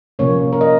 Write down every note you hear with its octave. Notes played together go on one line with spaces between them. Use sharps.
C3 F3 A#3 C#4 C#5
A#4
D#5